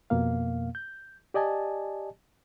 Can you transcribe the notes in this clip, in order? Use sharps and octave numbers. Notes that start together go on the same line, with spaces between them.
F2 B2 A#3 F5
G6
G4 D5 D#5 G#5 A5